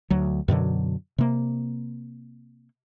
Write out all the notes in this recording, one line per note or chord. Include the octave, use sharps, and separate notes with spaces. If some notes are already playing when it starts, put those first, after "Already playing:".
D2 F#3
F#2 B2 D3 F#3
C3 A#3